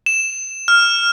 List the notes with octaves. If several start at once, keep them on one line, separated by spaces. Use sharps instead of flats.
E7
F6